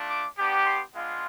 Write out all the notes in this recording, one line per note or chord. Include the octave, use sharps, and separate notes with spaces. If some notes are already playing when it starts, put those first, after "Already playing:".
Already playing: A3 D4 F4
D6
B3 D4 G4
C6
G#3 B3 D4 F4